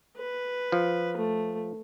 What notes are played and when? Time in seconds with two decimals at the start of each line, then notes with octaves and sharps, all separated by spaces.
0.17 B4
0.72 F3
1.17 A3